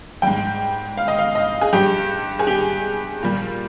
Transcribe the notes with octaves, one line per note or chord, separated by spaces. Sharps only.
G#2 G3 G5
F5
D#5
F5
D#5
G#4
G2 G3 G4
G#4
G4
A#2 G3